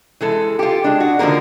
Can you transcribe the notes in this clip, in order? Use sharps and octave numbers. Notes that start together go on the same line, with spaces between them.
E3 G#3 A4
F4 G4
G#3 D4
F#4
D3 D#3 F3 A#3 A#4